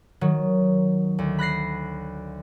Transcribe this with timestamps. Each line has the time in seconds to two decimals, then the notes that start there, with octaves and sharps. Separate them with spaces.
0.21 D#3 F#3
1.19 D2
1.39 B5 F#6 A#6 C7